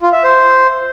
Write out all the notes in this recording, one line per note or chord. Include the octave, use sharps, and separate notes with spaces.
F4
E5
C5